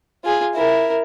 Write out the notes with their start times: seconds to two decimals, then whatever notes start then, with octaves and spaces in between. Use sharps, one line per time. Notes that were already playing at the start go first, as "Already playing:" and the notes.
0.24 F4 G#4
0.55 E4 A#4